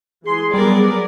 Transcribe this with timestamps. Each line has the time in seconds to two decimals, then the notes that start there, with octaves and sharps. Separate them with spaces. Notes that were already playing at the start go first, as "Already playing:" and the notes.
0.24 E3 G#4 C6
0.54 F#3 G3 B3 A#4 D5